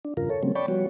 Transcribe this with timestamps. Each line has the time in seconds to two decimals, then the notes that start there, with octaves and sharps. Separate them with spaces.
0.05 D4
0.17 E2 G2 C#3 F4 A#4
0.30 A4 C#5
0.43 C#3 F#3 G3 A#3 C4 C#4
0.55 C#5 D5 G5 A5 B5 C#6
0.68 F3 G3 B3 F#4 C#5